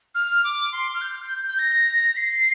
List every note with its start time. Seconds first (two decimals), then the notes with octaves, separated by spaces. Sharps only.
0.15 F6
0.44 D6
0.72 C6
0.94 F6
1.01 G6
1.47 G6
1.59 A#6
2.17 C7